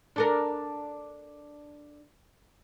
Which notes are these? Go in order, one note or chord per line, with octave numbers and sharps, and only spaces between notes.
D4 A4 A#4